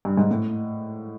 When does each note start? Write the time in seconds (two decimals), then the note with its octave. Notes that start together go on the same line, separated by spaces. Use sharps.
0.05 G2
0.17 G#2
0.31 A2